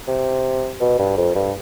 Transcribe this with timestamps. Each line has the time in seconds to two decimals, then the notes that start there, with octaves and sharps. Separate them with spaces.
0.07 C3
0.81 B2
0.99 G2
1.17 F2
1.35 G2